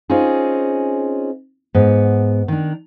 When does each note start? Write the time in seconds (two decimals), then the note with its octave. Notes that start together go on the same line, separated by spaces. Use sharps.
0.10 C4 C#4 D#4 F4 G#4
1.75 G#2 B3
2.48 D#3 D4